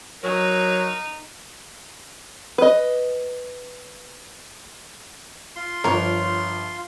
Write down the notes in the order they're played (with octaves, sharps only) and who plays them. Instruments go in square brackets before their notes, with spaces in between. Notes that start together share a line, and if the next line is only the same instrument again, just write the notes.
[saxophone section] F#3 [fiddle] D#4 [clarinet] A#4
[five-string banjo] B4 D#5
[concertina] F4 C6
[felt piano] G1 F3 [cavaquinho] A#4 C#5